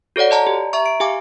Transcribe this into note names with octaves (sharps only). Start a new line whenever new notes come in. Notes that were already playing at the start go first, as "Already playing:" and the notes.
F#4 A4 C#5 D5 F#5
D5 D#5 A5 A#5
G4
E5 A#5 C#6
D7
G4 F5 G#5 D6